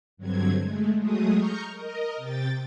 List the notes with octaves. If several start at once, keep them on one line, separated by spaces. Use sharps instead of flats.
G2 D3 F#3 C4 G#6
G#3 A3
F#3 G#3 A3 G#4 D#6
A#5 C#6 F6 G6
A#4 D#5
C3 G5 A6